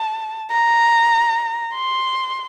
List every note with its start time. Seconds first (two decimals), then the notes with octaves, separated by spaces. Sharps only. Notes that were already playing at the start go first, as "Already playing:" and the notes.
Already playing: A5
0.51 A#5
1.74 C6